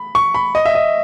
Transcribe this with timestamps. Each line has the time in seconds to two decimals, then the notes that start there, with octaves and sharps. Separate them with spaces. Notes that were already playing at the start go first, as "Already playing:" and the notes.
Already playing: B5
0.15 C#6
0.35 B5
0.55 D#5
0.65 E5
0.75 D#5